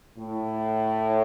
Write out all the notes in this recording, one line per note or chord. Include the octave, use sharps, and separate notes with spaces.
A2